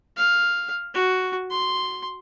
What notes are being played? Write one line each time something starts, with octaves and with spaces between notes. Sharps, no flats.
F5
F#4
C6